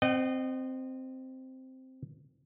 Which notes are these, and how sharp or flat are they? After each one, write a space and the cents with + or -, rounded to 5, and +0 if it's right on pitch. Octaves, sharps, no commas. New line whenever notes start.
C4 -5 D#5 -25 F#5 +45